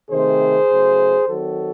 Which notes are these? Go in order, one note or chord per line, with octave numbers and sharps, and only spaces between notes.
C3 D#3 A3 C4 G#4 C5
C#3 F#3 A3
D#3 F#3 C4 F#4 A4